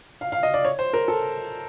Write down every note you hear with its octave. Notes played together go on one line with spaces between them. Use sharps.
F5
F5
D#5
D5
C#5
C5
A#4
A4